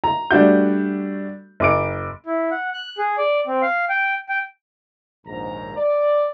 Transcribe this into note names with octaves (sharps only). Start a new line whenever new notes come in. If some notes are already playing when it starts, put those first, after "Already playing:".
A#5
G3 A3 D4 F#4 G6
F#1 D6 D7
E4
F#5
F#6
G#4
D5
C4
F5
G5
G5
A#1 D#2 G#2 A#5
D5